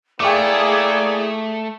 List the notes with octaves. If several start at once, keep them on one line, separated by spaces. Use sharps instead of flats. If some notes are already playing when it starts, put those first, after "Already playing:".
A3 A#3 E4 G#4 D5 G5 C#6 D6